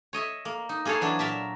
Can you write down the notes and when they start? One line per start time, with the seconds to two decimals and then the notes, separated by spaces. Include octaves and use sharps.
0.13 C#5 D#5 E5
0.45 A#3
0.69 D#4
0.85 A#3 G#4 A4 C#5 F5
1.01 E3 F#3 D4
1.19 A#2 A#4 E5 A5